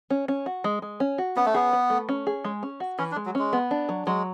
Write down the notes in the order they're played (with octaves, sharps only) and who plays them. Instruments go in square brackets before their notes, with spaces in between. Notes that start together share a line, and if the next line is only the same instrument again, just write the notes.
[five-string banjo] C#4
C#4
F#4
G#3
G#3
C#4
F#4
[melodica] B3 [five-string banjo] C#4
[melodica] A3
[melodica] B3 [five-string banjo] G#4
[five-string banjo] B4
A3
C#4
G#4
G#3
C#4
F#4
[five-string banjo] E3 [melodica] C#4
[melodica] D4
[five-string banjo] G#3
[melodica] F#3
[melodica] G#3 [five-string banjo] C#4
[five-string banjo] B3
D4
F#3
[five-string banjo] F#3 [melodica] G#3